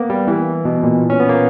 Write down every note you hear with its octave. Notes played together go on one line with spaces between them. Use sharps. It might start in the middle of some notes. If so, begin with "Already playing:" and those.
Already playing: A#3 B3
G3
E3
B2
A#2
C#4
B3
A#3